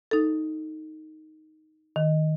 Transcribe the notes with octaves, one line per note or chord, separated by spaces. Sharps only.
D#4 A4
D#3